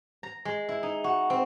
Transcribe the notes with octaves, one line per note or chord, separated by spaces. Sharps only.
A#5
G#3
E4
D#4
F#4
C4